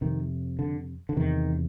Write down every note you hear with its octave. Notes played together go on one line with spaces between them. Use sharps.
F2 C3 D#3
D3
D3
E2 C3 D#3